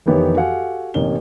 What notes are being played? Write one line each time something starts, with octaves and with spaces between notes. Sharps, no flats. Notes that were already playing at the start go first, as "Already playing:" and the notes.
F1 D#3 E3 B3 G4 C#5
F#4 G4 A4 F5 F#5 G#5
A1 C3 A#3 C#4 D#4 G7